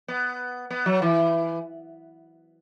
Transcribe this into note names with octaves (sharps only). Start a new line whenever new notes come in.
B3
B3
F#3
E3